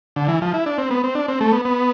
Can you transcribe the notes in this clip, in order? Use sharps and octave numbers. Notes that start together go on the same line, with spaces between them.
D3
E3
F3
E4
D4
C4
B3
C4
D4
C4
A3
B3
B3